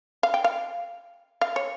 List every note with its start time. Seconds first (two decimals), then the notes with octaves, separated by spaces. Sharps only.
0.23 F5
0.34 G5
0.44 F5
1.41 F5
1.56 C#5